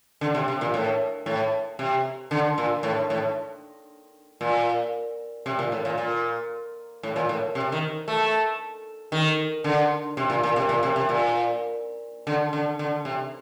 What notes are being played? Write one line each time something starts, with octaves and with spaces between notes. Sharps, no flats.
D3
C3
C3
A#2
A2
A2
C3
D3
A#2
A2
A2
A#2
C3
A#2
A2
A#2
A#2
A2
A#2
A2
C3
D#3
A3
D#3
D3
C3
A#2
A#2
C3
A#2
C3
C3
A#2
D3
D3
D3
C3